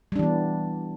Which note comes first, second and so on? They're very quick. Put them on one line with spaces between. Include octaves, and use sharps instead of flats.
G3 D4 E3 B3